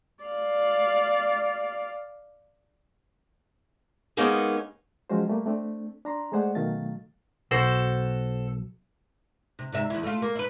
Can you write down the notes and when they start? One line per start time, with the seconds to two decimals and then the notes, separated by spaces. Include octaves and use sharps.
0.24 D5 F5
4.17 G#3 A#3 B3 C#4 D#4 G#4
5.10 F3 F#3 G#3 C#4 F#4 C5
5.28 G3 A3 A#3
5.46 A3 C4 D4
6.05 D4 A#5 C6
6.32 G#3 A3 G#4 C5 D5 F#5
6.55 B2 D#3 F#3 A3 F5 A6
7.51 B1 F#4 A4 C5
9.59 C3
9.72 G#2 C3 E5
9.90 E2 E4
10.03 A3 F4
10.22 A#3
10.36 E4 B4